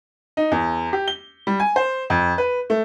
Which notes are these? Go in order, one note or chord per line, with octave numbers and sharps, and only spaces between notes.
D#4
E2
G4
G7
G3
G#5
C5
F2
B4
A3